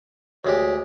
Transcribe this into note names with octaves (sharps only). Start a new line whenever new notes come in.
D2 G#3 G4 C#5